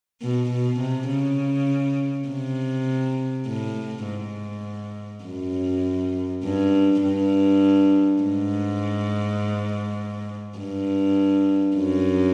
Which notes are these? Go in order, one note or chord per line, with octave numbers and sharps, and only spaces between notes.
B2
B2
C3
C#3
C3
A2
G#2
F#2
G2
G2
G#2
G2
F#2